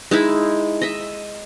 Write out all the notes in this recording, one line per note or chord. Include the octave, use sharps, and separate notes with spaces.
G#3 D#4 E4
D#5 E5